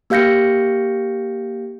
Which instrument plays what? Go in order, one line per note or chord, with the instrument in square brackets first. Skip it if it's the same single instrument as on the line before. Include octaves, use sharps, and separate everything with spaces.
[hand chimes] A#3 G4 F5 G6 A#6 C#7